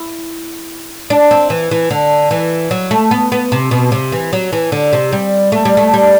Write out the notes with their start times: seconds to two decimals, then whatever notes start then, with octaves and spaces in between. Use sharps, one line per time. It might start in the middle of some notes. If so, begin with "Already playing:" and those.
Already playing: E4
1.10 D4
1.31 C4
1.50 E3
1.71 E3
1.91 D3
2.31 E3
2.71 F#3
2.91 A3
3.11 B3
3.32 B3
3.52 C3
3.71 B2
3.92 C3
4.12 E3
4.33 F#3
4.53 E3
4.72 D3
4.93 C3
5.13 G3
5.52 A3
5.65 G3
5.77 A3
5.94 G3